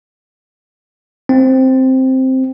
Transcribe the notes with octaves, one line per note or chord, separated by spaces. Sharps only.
C4